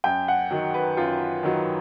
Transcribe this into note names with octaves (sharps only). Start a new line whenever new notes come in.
F#2 G5
F#5
D#3 F#3
B4
F#2 F4
D#3 F#3